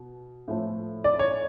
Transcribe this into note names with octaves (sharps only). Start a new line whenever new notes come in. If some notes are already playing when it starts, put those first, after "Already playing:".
Already playing: B2
A2 F3 A3
D5
C#5